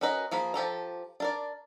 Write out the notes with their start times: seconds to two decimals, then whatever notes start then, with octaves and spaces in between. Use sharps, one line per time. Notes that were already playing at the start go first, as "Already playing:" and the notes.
0.01 C#4 F#4 A#4 B4 D#5
0.31 F3 A#3 G#4 B5
0.54 F3 G4 A4 A#5
1.20 D4 A#4 D5